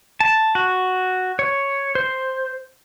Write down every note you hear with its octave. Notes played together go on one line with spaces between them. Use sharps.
A5
F#4
C#5
C5